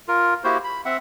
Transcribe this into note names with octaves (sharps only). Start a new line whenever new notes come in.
F4 A#4
A#3 E4 F#4 G4 C5
B5
C4 E5 F#5